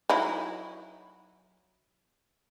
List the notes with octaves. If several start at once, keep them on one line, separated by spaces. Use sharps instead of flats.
F#3 D#4 E4